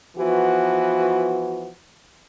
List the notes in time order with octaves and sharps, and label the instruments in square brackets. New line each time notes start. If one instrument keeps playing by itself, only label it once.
[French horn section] E3 F3 B3 F#4